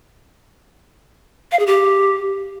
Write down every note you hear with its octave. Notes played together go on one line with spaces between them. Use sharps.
F5
G#4
G4